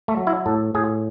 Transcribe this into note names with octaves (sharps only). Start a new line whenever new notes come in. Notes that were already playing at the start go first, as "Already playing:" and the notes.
A3
F#3
E4
A2 A4
A2 G#4